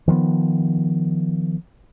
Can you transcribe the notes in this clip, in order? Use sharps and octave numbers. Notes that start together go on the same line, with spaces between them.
D#3 F3 G#3 B3